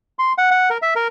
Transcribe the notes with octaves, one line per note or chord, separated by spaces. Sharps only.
C6
F#5
F#5
A#4
E5
A#4